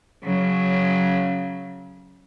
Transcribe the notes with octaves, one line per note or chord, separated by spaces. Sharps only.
C#3 F#3